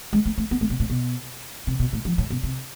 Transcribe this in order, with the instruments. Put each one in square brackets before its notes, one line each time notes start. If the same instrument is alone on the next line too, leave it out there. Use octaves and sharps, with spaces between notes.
[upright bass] G#3
A3
A3
B3
A3
B2
A2
B2
C3
B2
A2
F3
A2
B2
C3